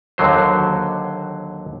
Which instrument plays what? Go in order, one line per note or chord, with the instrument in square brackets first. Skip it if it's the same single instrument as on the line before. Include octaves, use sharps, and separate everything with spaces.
[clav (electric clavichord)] D#2 D3 F#3 C5